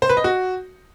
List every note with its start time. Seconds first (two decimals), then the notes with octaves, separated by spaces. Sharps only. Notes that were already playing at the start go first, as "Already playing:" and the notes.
0.02 C5
0.09 B4
0.17 D#5
0.24 F#4